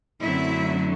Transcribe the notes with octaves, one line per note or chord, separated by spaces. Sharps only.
F#2 D3 F#3 A3 C4 E4 E5